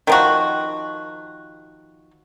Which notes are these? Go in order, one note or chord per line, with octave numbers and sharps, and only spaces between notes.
D#3 F3 F#4